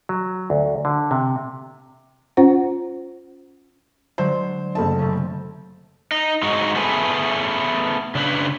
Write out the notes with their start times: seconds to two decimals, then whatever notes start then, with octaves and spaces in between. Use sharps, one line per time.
0.09 F#3
0.50 D2
0.85 D3
1.11 C3
2.37 C#4 F4 C5 F#5
4.18 D3 F#3 G#3 C5
4.75 F#1 A3 A5
4.99 C3 C#4
5.11 C4
6.12 D#4
6.43 G#3 D#4 F#4
6.75 A3 B3 G#4 A4 B4
8.15 C#3 D4 B4